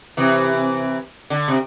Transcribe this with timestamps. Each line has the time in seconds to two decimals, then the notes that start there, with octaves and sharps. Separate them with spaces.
0.17 C3 E3
1.30 D3
1.48 C3